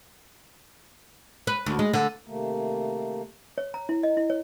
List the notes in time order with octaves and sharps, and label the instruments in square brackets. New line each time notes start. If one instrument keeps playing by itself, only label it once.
[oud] B4
D2
G#3
D3
[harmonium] C3 D#3 A3 A#3
[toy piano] C#5
A#5
E4
D#5
E4
C#5